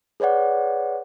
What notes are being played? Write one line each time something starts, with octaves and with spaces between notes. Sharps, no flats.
G#4 B4 C#5 D5 F#5